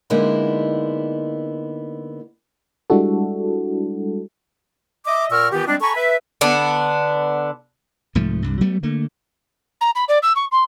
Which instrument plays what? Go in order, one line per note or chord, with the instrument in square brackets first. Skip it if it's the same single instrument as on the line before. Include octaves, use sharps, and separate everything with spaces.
[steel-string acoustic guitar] D3 G#3 A#3 B3 D#4 E4
[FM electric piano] G3 G#3 D4 E4 F#4 A4
[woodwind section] D#5 E5 D6
A#2 A#4 F#5 C#6 E6 F6
D#3 E3 B3 F4 G4
G3 G#3 C4 D4
A4 G#5 A#5 B5 C#6
B4 E5
[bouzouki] D3 B3 D4
[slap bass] C2 G#2 F3 A3
C2 G2
F#3 G3 A3 B3
D3 A3 A#3
[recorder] A#5
B5
D5
E6
C#6
C6